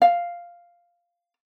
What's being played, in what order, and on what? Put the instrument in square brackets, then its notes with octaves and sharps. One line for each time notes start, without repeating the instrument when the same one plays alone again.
[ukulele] F5